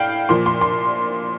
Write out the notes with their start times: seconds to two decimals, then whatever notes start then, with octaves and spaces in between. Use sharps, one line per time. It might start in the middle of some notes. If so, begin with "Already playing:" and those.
Already playing: A2 F5 G5 B5
0.29 A#2 F3 C6
0.46 C6
0.61 C6